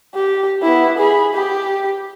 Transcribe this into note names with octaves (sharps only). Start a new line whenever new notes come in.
G4
B3 E4
G#4 B5
G4